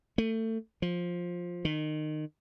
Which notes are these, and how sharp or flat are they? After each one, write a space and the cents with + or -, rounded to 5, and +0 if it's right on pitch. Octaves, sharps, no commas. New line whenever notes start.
A3 +25
F3 +10
D#3 -25